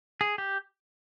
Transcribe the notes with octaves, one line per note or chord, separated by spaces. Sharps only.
G#4
G4